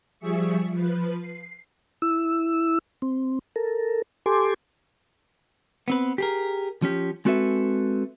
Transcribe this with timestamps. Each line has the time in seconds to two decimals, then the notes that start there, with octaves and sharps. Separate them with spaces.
0.19 F3 G3 G#4 E5 C#6
0.71 F3 B4
1.20 C7
2.02 E4 E6
3.02 C4
3.56 A4 A#4
4.26 G4 A4 G#5 C6 D6
5.88 B3 C4 B4
6.18 G4 G#4 A#4
6.82 F3 C#4 G4
7.25 G#3 C4 F#4 A4 B4 E5